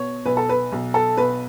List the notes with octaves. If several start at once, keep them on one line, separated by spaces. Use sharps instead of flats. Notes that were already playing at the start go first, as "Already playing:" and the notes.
Already playing: B2 C#5
B1 B4
A4
B4
B1
A4
B2 B4